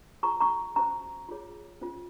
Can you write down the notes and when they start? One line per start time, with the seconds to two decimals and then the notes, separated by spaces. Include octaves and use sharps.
0.23 F4 G#4 C5 A#5 C#6
0.40 A#5 C#6
0.76 C#4 F#4 C5 A#5 C#6
1.29 F4 G#4 C#5
1.81 C#4 F4 C5